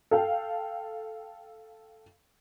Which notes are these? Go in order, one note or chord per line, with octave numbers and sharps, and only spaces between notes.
A4 F5 G5